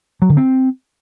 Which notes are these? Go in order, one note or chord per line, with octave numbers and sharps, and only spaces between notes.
F#3
D3
C4